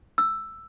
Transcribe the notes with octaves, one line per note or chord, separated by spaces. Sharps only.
E6